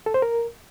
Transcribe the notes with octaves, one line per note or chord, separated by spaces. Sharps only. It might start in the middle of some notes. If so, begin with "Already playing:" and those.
A4
C5
A#4